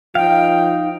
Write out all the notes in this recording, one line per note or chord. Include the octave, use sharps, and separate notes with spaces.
F3 D#4 F5 G5